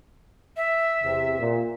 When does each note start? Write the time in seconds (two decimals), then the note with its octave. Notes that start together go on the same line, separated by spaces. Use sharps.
0.57 E5
1.03 E2 C3
1.40 A#2